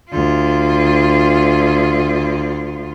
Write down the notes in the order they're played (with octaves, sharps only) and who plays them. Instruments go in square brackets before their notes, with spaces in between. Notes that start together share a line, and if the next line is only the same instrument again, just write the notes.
[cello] D2 F4